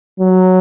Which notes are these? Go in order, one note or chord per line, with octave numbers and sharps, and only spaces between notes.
F#3